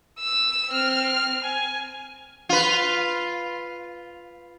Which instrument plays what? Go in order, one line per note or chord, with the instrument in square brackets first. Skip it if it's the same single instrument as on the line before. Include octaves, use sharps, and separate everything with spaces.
[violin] E6
C4 F6
G#5
[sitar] F4 B4